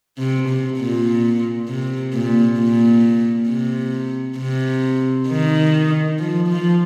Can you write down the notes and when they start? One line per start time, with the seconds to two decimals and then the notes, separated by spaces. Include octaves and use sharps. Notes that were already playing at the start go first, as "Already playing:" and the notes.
0.18 C3
0.48 C3
0.78 A#2
1.69 C3
2.13 A#2
2.59 A#2
3.49 C3
4.38 C3
5.29 D#3
6.19 F3
6.48 F3